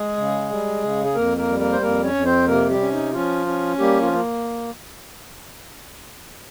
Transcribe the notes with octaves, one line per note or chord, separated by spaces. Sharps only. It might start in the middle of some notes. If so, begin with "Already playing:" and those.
Already playing: G#3 G#4
C#3
G3
C#3
G#4
F2 A#3 A#4
A#3 A#4
G3
A#3 A#4
C5
F2 A#3 A#4
C#4 C#5
F2
C4 C5
C3 A#3 A#4
G3 G4
C#4
D#4
F3 C#4 F4
C#4
G3 A#3 G4
F3 F4
A#3